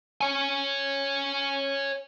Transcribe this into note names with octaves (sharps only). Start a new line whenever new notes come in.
C#5 G#5